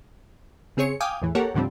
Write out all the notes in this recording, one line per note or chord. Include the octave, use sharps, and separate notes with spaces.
C#3 C4 G#4 C#5 C#7
F5 G5 G#5 D6 D#6
E2 A2 E3
A#3 G4 A4 A#4 C#5 F#5
D#2 A2 D3 F3 G3 C4